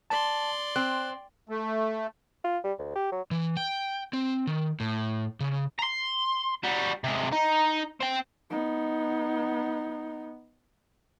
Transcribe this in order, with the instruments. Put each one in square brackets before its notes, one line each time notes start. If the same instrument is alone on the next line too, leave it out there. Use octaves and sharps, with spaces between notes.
[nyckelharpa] D5 C6 [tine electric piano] A5
[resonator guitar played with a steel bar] C4 [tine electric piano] F#6
[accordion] A3
[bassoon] F4
G3
D2
G4
F#3
[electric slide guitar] E3
G5
C4
D#3
A2
C#3
[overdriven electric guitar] A#5 C6
G3 F#4
C3 G#3
D#4
C4 G5
[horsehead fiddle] B3 D#4